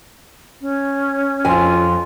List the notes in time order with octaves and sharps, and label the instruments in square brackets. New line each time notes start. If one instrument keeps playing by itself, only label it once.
[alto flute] C#4
[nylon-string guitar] F2 G#5 [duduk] F4